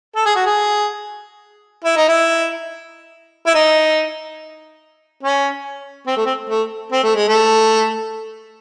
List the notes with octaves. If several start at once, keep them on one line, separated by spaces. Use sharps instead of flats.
A4
G#4
F#4
G#4
E4
D#4
E4
E4
D#4
C#4
C4
A3
C4
A3
C4
A3
G#3
A3